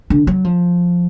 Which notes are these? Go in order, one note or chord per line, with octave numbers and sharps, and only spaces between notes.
D3
F#3
F3